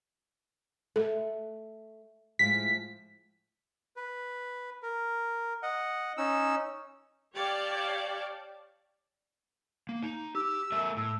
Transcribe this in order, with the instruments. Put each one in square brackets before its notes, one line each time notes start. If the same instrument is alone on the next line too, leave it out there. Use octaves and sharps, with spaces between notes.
[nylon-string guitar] A3 [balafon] A4
[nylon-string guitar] A2 F3 G#3 [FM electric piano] B6
[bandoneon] B4
A#4
D#5 F#5
C#4 D#4 E6
[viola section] G4 C#5 D5 F5 G5 A5
[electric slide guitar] A#3
D#4
[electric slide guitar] G4 [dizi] E6
[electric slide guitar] A3 A#4 E5
[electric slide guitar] A2 [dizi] E6